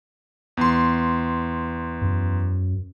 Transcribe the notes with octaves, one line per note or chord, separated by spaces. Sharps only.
E2 C6
F#2